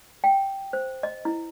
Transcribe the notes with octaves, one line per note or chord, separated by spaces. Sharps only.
G5
C5
D#5
E4